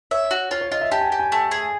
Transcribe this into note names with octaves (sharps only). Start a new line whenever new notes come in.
C#5 E5
F#4
F4 C#5
C#5
F4 D#5
E5
G4 A5
G#5
G4 G5
G#5
A3
G#4